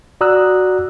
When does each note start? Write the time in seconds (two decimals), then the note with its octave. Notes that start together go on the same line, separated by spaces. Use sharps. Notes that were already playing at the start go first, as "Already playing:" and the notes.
0.21 F#4 D5 A#5 D#6 E6 F#6